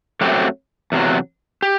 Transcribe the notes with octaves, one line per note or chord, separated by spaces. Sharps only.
F#2 F#3 A3 C4 G4
E2 C3 F#3
G4